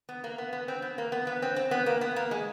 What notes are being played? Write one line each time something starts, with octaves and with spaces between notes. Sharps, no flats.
B3
A#3
B3
B3
C4
B3
A#3
B3
B3
C4
C4
B3
A#3
B3
A#3
G#3